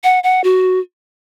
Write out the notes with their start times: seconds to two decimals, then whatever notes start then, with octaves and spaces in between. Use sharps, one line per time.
0.04 F#5
0.24 F#5
0.44 F#4